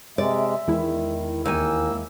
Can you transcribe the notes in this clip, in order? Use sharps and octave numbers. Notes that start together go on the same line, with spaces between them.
C3 G#3 D5 E5
E2 D#3 G#3 E4
D#2 A#3 G#5 E6